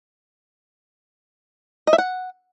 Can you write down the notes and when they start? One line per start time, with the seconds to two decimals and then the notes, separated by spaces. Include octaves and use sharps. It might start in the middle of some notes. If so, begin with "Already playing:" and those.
1.87 D#5
1.93 E5
1.98 F#5